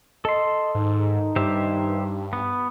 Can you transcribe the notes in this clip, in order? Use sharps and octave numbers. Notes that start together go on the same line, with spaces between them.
A4 D#5 C6
G#2 D#3 D#4
G2 G4 C5 E5
B3